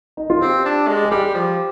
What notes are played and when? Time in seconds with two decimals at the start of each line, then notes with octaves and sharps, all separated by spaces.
0.17 D#4
0.30 F4
0.42 C4 G4
0.65 D4
0.88 G#3
1.05 G#4
1.11 G3 G4
1.35 F3